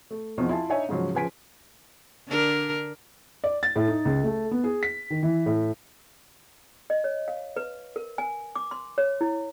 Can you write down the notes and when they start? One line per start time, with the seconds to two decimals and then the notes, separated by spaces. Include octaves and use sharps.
0.11 A3
0.38 E2 B2 F3 C4 D#4 C#6
0.49 E4 F4 G#5 A5
0.70 D4 D#4 C#5 E5 G#5
0.89 G#2 C#3 F3 F#3
1.14 C#3 F3 B4 G#5 B6 D7
2.27 D3 D4 A#4
3.44 D5
3.63 A6
3.76 A2
3.88 D#4
4.05 C#2
4.24 A3
4.51 B3
4.64 G#4
4.83 B6
5.10 D#3
5.23 E3
5.46 A2
6.90 D#5
7.04 C#5
7.28 F5
7.56 B4
7.96 A#4
8.18 G#5
8.56 D6
8.71 C6
8.98 C#5
9.21 E4